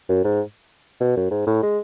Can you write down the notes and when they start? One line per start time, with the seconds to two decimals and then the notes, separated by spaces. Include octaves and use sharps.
0.09 F#2
0.25 G#2
1.00 B2
1.17 F#2
1.31 G#2
1.47 A2
1.63 G#3